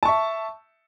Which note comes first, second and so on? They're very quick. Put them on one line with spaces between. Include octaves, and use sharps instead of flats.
A5 C#6 E5